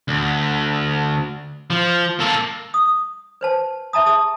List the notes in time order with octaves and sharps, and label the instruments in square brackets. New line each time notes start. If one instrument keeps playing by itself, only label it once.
[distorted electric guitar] D2
F3
A#3 A4
[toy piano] D#6
B4 C5 A5
E5 A5 A#5 D#6
G#4 A5 D#6